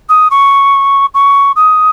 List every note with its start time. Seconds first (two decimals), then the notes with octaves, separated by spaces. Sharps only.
0.09 D#6
0.30 C#6
1.14 C#6
1.56 D#6